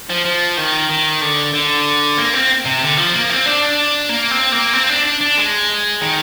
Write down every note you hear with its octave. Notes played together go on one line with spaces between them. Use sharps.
F3
F3
D#3
D#3
D3
D3
A#3
C4
C3
D3
F3
A#3
C4
D4
A#3
C4
A#3
C4
D4
D4
D4
G#3
D#3